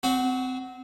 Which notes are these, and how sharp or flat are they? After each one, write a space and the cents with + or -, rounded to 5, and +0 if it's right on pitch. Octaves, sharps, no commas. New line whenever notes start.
C4 -20 F#4 +10